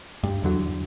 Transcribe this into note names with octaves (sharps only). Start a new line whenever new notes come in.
G2
E2 D3 F#3